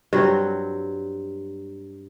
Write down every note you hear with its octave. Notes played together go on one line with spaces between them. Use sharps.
G2 F#3 C4